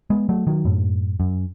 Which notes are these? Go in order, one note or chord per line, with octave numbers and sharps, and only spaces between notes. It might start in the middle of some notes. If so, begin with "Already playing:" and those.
G#3 B3
F#3 A3
D#3 F#3
F#2 A2
F#2